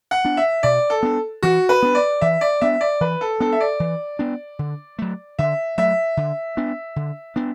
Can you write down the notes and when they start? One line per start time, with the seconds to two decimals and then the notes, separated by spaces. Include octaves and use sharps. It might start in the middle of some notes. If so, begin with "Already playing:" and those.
0.11 F#5
0.24 B3 D4
0.37 E5
0.63 B2 D5
0.90 A4
1.03 B3 D4
1.43 E3 F#4
1.69 B4
1.82 B3 D4
1.95 D5
2.21 E3 E5
2.41 D5
2.61 B3 D4 E5
2.81 D5
3.01 E3 B4
3.21 A4
3.40 B3 D4 A4
3.53 E5
3.60 D5
3.80 E3
4.19 B3 D4
4.59 D3
4.99 F#3 A3
5.39 D3 E5
5.78 F#3 A3 E5
6.17 D3
6.57 B3 D4
6.96 D3
7.36 B3 D4